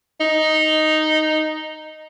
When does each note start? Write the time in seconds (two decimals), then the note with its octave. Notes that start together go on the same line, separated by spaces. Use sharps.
0.21 D#4